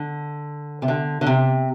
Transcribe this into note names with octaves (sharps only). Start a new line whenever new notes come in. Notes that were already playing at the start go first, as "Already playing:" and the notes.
Already playing: D3
C3
D3
D3
C3